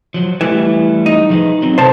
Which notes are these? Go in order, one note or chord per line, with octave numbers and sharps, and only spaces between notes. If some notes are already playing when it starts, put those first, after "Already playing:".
F3 F#3
E3 G3 A3
D#4
F3 G#4 B4
F#3 C4
C3 A4 C5 C#5 A5